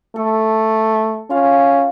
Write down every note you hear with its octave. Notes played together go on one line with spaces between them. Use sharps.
A3 A4
C#4 F4 F5